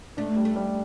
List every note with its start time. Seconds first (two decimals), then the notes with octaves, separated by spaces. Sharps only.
0.17 A3 D4
0.36 G3
0.45 A3
0.56 G3